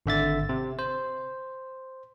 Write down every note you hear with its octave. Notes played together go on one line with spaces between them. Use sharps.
G#1 D3 E5 A6
C3
C5